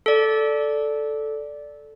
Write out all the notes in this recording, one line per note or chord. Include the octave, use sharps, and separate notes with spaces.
A4 D5